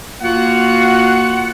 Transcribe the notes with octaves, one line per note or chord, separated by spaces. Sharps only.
A#3 F4 F#4 F#5